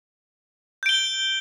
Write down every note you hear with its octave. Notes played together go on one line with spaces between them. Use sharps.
G6 D7 G7